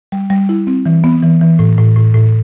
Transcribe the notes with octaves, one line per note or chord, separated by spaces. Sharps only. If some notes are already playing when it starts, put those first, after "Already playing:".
G3
G3
E4
C4
E3
B3
E3
E3
A2
A2
A2
A2